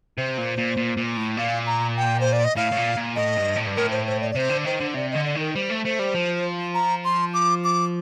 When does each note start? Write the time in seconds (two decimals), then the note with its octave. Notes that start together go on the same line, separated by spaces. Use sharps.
0.18 C3 C5
0.38 A#2
0.58 A#2
0.77 A#2
0.97 A#2
1.17 A2
1.37 A#2 F5
1.66 A#5
1.97 G5
2.20 C5
2.33 D5
2.44 D#5
2.56 A2 F5
2.72 A2
2.77 A#2
2.96 A#2
3.16 A2 D#5
3.37 G2
3.56 A2
3.66 G2
3.76 A2 A#4
3.91 C5
4.06 C5
4.21 D5
4.31 D5
4.35 C3 C5
4.50 D3
4.65 D#3 C5
4.80 D3
4.94 C3 D5
5.11 D3 D#5
5.25 D5
5.35 D#3 A#4
5.54 G3 C5
5.70 A3
5.84 A3 C5
5.99 G3
6.14 F3
6.74 A#5
7.04 C6
7.34 D6
7.64 D6